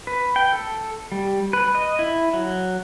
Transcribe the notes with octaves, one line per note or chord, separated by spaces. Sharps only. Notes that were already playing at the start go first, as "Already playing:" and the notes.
B4
G5
A4
G3
B4
D#5
E4
F#3